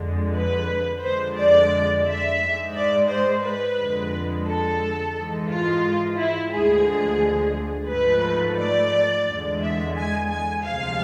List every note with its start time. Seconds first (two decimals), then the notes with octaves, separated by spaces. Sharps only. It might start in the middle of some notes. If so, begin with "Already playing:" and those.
Already playing: F2 D3 G#3
0.35 B4
1.02 F2 D3 G#3 C5
1.37 D5
2.06 E5
2.39 G#2 G#3
2.75 D5
3.08 C5
3.43 B4
3.77 F2 D3 G#3
4.46 A4
5.14 G#2 E3 G#3
5.49 F4
6.17 E4
6.51 D2 D3 F3 G#3 G#4
7.89 G#2 F3 A3 B4
8.58 D5
9.26 E2 D3 G#3
9.61 E5
9.95 G#5
10.29 G#5
10.63 D2 C3 F3 G#3 F5